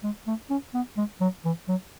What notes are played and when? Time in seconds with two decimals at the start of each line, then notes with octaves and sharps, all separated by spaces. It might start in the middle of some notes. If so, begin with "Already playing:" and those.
0.03 G#3
0.27 A3
0.50 C#4
0.74 B3
0.97 G#3
1.21 F#3
1.45 E3
1.68 F#3